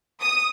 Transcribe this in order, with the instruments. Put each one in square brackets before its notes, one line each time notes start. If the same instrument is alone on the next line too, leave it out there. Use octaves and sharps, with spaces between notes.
[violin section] D#6